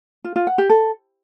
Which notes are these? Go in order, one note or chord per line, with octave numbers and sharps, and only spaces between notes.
F4
F4
F#5
G4
A4